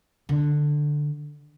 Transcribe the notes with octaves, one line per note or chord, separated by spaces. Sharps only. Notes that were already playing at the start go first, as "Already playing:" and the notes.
D3